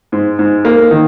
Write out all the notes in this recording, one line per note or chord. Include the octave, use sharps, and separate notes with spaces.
G#2
G#2
A#3
D#3